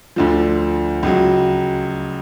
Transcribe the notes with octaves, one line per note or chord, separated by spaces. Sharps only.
D2 D3 F3
C#2 C#3 F#3